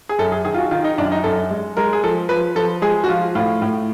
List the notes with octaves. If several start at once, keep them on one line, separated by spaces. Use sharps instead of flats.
G#4
F#2 A4
G#4
D#3 G#4
F4
F#4
D#3 F4
D#4
F#2 D4
D#4
F#2 A4
G#3
G#3 A#4
G#4
F3 A4
F3 B4
F3 A4
G#3 G#4
F#4
F3 F4
A2 F4
A2